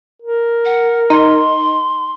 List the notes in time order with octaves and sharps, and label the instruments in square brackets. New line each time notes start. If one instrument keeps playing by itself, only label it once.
[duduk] A#4
[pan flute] F#5
[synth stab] D#4 [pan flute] C6